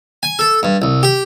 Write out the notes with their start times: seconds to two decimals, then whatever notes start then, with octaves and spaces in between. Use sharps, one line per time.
0.23 G#5
0.39 A4
0.63 G2
0.82 C2
1.03 G4